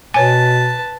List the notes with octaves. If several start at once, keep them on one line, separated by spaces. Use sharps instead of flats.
B2 B4 C#5 G#5 A5